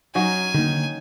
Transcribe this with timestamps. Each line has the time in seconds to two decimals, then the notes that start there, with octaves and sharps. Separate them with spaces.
0.15 F#3 C#4 D#4 G#5
0.54 D3 D#3 A#3